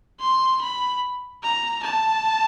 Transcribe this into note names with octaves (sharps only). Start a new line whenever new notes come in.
C6
B5
A#5
A5